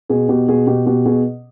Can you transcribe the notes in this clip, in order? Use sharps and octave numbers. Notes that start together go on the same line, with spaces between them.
B2 G#4
B2 G4
B2 G#4
B2 G4
B2 G4
B2 G#4